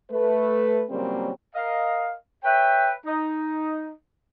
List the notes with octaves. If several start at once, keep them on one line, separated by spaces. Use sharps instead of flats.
A3 B4
A#2 C#3 F#3 G3 A#3 C4
A#4 D#5 F5
B4 C#5 E5 G5
D#4